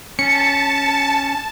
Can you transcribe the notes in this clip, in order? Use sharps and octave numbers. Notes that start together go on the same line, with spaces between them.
C#4 A5 C#7